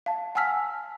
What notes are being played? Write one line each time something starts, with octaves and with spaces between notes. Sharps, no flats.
F5 A5
F#5 G#5 A5 E6 F6 B6